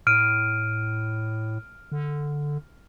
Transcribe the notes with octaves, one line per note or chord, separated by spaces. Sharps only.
A2 F6 D7 D#7
D3